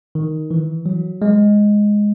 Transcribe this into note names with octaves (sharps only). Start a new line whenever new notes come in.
D#3
E3
F#3
G#3